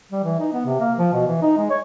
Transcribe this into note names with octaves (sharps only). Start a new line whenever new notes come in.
G3
E3
D#4
B3
C3
A#3
F3
B2
E3
D#4
G#3
C#5